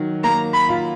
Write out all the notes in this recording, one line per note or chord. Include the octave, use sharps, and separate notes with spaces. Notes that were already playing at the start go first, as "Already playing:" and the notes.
Already playing: D#3 F#3
A#3 A#5
B5
F4